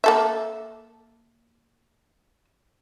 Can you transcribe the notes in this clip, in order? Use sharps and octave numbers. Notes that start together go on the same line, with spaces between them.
A#3 A4 E5